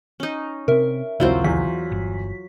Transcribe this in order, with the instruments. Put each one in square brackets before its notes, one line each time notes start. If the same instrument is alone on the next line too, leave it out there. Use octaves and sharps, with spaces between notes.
[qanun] C#4 D#4
[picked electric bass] C3 C4 [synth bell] A#4 E5
[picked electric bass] A#1 D#2 C#3 [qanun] F#3 F4 C5 [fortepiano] C4 E4
[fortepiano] E2 [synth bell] B6
[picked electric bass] G1